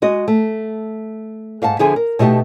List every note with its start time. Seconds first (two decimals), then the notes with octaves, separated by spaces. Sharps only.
0.02 G#3 F#4 D#5
0.28 A3
1.62 G#2 F5 F#5 A5
1.79 D3 F3 B3 G#4 E5 G#5
1.96 A#4
2.19 B2 A3 D#4 G4 A5